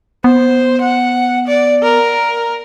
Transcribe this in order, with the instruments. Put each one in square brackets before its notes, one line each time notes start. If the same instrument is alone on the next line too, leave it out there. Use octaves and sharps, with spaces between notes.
[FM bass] B3 [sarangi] C5
[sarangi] F#5
D5
A#4